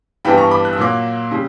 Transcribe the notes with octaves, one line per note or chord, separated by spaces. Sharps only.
G2 E3 G3 B3 D4 G5 B5
A#5 C#6
B5 D6
F#6
E6
A#2 F#3 A#3 D6 F#6
C#3 G3